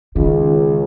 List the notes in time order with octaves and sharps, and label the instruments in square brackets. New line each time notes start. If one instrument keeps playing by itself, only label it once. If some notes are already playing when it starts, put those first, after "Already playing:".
[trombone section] C#2 [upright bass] D#3